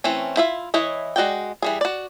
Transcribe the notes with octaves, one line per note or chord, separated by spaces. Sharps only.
E3 A3 C4 C#4
E4 F4 E5
E3 E4 C#5 D#5
G#3 F#4 D5 G5
E3 G3 G#4
F#4 D5